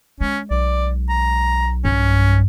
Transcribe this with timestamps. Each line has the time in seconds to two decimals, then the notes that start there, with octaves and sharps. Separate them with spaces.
0.21 G#3 C#4
0.51 B1 D5
1.10 A#5
1.85 G2 C#4